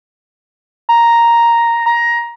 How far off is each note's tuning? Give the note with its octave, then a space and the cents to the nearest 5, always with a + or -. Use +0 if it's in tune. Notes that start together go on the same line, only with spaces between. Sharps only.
A#5 +0
A#5 +15